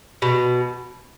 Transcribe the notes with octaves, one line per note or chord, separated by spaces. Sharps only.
B2